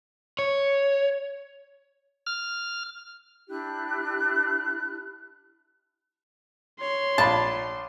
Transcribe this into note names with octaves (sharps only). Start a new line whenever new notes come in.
C#5
F6
D4 E4 G4 F#6
C#5 C6
A#1 A5 B5